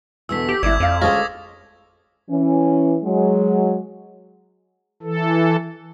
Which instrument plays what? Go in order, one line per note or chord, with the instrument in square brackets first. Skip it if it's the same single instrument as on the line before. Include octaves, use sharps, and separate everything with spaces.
[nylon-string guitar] E2 B2 D3 [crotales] E6 B6
[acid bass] G4
[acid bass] G#1 [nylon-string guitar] E4 D5 [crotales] D6 G#6
[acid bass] F2 [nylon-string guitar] D5 F5
[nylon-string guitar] D2 G#4 D#5 [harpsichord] G#3 C#4 F4 [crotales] D#6 A#6
[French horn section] E3 C#4
F#3 G#3
[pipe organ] E3 A4